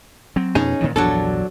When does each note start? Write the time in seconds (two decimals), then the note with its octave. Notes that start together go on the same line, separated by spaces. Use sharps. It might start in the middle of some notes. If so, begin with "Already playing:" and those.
0.36 F#3 C4
0.55 F2 B2 C#4 D#4 G#4
0.81 A#2 D#3 E3
0.96 A#1 E2 G2 F#3 D4 A4